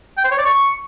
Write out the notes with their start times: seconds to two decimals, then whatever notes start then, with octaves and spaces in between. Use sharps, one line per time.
0.17 G5
0.24 C5
0.31 C#5
0.38 D5
0.45 C#6